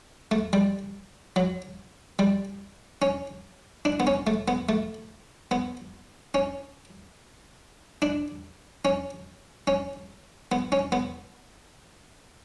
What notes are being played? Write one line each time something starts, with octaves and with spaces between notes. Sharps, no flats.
A3
G3
F#3
G3
C#4
D4
B3
C#4
A3
B3
A3
B3
C#4
D4
C#4
C#4
B3
C#4
B3